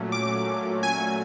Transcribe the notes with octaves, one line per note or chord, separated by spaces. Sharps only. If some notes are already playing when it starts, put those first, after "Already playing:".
Already playing: A#2 F#3 A3 C#4
D6
G#5